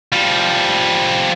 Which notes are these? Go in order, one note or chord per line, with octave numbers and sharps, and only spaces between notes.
F3 G3